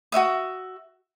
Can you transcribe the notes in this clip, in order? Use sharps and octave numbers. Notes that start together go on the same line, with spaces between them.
F#4 C#5 E5 D#6